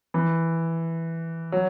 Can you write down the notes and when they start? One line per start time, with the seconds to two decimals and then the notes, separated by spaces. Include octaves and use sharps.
0.14 E3
1.52 F#3